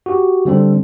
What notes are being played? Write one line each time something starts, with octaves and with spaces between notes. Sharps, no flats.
F#4 G4
D3 G3 C4 A4